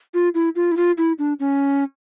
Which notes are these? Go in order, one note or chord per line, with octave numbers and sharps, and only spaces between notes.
F4
E4
F4
E4
F4
E4
D4
C#4